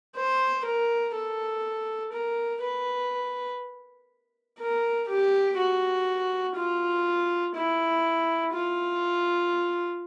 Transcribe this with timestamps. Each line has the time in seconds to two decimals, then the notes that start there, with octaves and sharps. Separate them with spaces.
0.16 C5
0.65 A#4
1.15 A4
2.13 A#4
2.62 B4
4.59 A#4
5.09 G4
5.58 F#4
6.56 F4
7.55 E4
8.53 F4